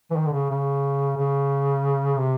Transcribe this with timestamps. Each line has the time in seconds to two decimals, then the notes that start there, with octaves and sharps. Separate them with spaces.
0.11 E3
0.16 D#3
0.26 D3
0.32 C#3
0.50 C#3
1.17 C#3
2.17 C3